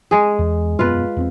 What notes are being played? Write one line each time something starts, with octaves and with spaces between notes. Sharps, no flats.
G#3 G#4
E2
E1 F#2 B3 F4 B4
E2 B3 C4